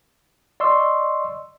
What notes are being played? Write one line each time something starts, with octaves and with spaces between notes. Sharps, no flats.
D5 D#5 C6 C#6 E6